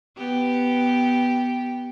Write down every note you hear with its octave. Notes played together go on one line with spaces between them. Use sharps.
B3 G4